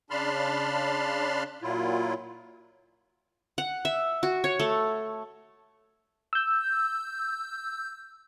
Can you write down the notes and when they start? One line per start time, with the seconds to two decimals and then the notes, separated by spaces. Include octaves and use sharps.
0.10 C#3 D4 A5 B5 C6 F6
1.62 A#2 F#3 E4 F4
3.58 F#5
3.85 E5
4.23 F#4
4.44 C#5
4.60 A3
6.33 E6 G6